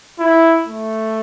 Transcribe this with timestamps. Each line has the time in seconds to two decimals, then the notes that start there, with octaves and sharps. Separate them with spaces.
0.19 E4
0.67 A3